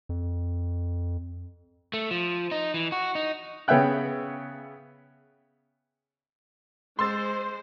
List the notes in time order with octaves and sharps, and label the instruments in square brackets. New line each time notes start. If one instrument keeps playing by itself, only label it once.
[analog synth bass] F2
[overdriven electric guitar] A3
F3
D#4
E3
F#4
D#4
[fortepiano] C#3 B3 C#5 E5 G5 F#6
[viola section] G#3 C5 [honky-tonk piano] C6 E6 A6